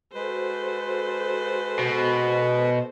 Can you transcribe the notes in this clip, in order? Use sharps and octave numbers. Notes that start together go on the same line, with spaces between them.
G#3 F#4 A4 B4 C5
B2